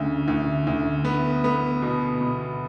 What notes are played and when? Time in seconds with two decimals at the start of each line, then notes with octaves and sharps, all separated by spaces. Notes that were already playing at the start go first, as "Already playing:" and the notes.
Already playing: D2 C#3
0.28 D2
0.67 D2
1.05 B3
1.44 B3
1.82 B2
2.21 B2